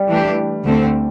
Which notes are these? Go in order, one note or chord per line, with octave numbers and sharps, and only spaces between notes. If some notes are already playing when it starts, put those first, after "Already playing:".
Already playing: G3
E3 A3 D4 G4
D2 D3 A3 C4